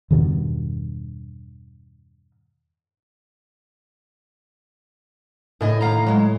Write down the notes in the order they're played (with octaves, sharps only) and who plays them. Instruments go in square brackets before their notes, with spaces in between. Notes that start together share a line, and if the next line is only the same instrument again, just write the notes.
[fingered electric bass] E2 G2 B2 D#3
[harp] A2 [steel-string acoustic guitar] D3 G#4 D#5
[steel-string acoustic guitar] D#2 F5 A#5
F#3 G#3